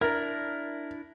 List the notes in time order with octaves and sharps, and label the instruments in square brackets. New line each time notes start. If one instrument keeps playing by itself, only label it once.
[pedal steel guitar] D4 E4 [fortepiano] A#4